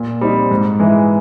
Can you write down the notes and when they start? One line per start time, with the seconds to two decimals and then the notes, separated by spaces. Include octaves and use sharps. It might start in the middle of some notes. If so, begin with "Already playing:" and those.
Already playing: A#2
0.21 G3 C4 D#4
0.51 G#2
0.80 E3 G#3